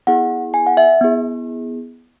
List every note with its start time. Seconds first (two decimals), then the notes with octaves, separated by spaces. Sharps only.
0.07 B3 E4 G#4 F#5
0.54 G#5
0.67 F#5
0.77 E5
1.01 B3 E4 G#4